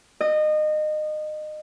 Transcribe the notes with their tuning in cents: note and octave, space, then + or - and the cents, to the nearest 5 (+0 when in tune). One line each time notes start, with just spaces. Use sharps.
D#5 -25